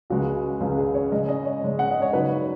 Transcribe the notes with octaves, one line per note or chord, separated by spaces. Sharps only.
C#2 C#3 G#3 F#4
C#2 C#3 G#3 G#4
G#4
C#5
C#3 G#3 C#4 D#5
D#5
C#5
C#3 G#3 C#4
F#5
D#5
C#5
C#3 F#3 D#4 B4